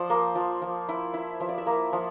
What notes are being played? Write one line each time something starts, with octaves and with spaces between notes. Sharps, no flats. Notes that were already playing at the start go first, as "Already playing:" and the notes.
Already playing: F3 C5 D5
A#3
F3
F3
E4
E4
F3 E5
D5
E5
A#3
F3